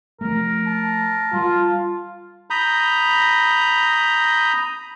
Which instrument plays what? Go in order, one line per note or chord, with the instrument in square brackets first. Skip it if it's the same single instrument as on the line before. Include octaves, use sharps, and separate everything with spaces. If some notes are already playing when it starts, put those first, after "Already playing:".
[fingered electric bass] F3 A3 [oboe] A#4
[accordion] A5
[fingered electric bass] G3 [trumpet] F4
[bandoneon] A#5 B5 D#6 G6